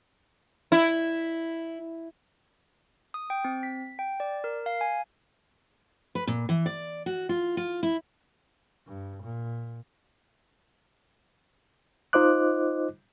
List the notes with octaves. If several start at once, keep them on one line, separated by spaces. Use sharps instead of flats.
E4
D#6
G5
C4
B6
G5
D5
A#4
F5
G#5
B4
A#2
E3
D5
F#4
F4
F4
E4
G2
A#2
D#4 F4 C5 D#5 D6 F#6